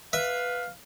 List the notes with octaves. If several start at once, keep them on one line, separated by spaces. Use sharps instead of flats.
B4 E5 F5